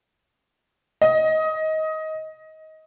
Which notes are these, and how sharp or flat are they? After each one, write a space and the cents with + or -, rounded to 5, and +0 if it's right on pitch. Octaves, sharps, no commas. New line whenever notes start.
D#5 +20